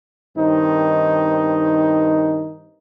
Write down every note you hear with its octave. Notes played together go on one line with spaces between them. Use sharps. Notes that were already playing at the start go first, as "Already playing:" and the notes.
G2 D#3 C4 D#4